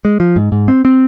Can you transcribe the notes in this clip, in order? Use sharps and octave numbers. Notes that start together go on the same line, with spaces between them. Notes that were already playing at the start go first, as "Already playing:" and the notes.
G#3
F3
G#2
G#2
C4
C4